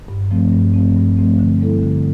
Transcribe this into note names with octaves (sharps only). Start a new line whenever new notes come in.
G2
F3 A3 C4
G2
F3 A3 C4
G2
F3 A3 C4
D3
G3 C4 E4 A4
D3